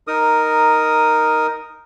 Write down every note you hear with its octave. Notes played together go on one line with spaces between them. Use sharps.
D#4 A#4 D#6